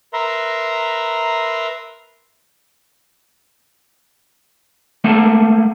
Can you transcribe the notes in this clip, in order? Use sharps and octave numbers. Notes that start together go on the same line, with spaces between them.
A#4 B4 E5 A#5 C6
A3 A#3 A4 F#5 A5